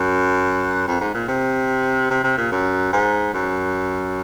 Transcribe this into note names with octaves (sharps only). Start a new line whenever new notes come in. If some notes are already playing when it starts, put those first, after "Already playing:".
Already playing: F#2
F2
G#2
A#2
C3
C3
C3
A#2
F#2
G#2
F#2